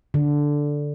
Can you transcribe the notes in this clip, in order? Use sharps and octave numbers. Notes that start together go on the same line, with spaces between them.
D3